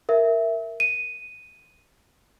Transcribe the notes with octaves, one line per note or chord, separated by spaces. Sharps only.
A#4 E5
D#7